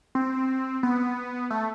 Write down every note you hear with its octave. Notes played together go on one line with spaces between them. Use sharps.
C4
B3
A3